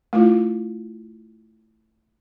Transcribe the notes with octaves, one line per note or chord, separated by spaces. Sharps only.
A3 E4 F4